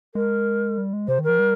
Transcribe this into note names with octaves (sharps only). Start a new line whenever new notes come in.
G#3 A#4
G3
G#3
C3 C5
D#3
F3 A#4
G3